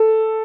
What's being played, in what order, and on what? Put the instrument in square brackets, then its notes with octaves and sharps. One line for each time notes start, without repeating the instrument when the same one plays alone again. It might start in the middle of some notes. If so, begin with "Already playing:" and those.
Already playing: [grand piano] A4